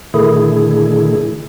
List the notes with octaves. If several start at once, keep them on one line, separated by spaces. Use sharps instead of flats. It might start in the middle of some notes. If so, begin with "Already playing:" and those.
A#2 D3 D#3 A3 E4 G#4